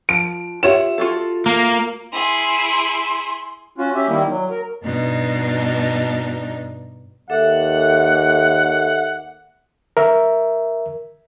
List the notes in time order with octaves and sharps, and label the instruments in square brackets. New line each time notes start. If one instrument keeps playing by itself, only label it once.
[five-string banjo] F3 [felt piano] D7
[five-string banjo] F4 C#5 F#5 [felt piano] G4 E5 E7
[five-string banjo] F4 F#4 A4
[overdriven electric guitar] A#3
[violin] E4 G#4 [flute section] C6
[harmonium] C#4 F4 F#4
C#4 G4 E5
D#3 G3 A#3 E4
F#3
A#4
[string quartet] G2 B2 D4 D#4
[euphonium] D#2 [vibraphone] A4 E5 D6 [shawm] F#5
[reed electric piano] A#4 E5